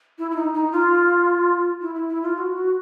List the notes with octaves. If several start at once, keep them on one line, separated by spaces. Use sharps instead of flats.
E4
E4
D#4
D#4
F4
E4
E4
E4
F4
F#4
F#4